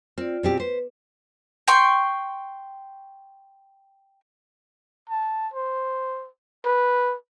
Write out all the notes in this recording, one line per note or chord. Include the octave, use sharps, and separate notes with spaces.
C4 F4 D5
B2 C4 G4
B4 C5
G5 C6 C#6
A5
C5
B4